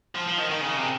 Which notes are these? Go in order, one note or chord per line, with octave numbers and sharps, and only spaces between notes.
F3
F3
D#3
D#3
C#3
C3